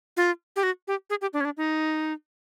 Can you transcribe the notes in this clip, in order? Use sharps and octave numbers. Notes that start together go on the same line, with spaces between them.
F4
G4
F#4
G4
G#4
G4
D4
C#4
D4
D#4